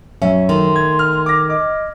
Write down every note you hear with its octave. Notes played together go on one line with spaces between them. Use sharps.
F#2 C#4 E5
D#3 A3 C6
G#6
F6
D6 A#6
D#5 D6